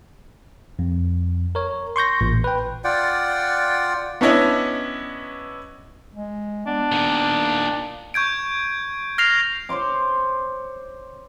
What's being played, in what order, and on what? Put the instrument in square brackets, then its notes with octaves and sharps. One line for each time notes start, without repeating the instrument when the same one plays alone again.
[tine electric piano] F2
A#4 C#5
C6 C#6 G6 A#6
A1 A#2
B4 G5
[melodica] F4 D5 F#5 G5
[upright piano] B3 C#4 D4 E4 C#5 D#5
[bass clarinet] G#3
[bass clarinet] B3 [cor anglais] D4
[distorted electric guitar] A#2 D#3
[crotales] C#6 G6 G#6 D7
F6 A#6 C7 F7
[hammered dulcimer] C5 C#5 C6 D6